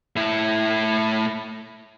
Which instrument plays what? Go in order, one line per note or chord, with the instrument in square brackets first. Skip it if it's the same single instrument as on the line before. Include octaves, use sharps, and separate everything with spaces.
[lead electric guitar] A2 E4